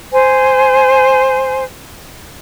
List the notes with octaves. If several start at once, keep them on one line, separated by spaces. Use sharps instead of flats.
C5 G#5